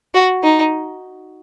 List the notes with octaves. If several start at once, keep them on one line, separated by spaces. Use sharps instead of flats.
F#4
D#4